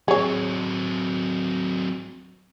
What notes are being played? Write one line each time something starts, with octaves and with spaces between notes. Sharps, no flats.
F#3 C4 G#4 C#5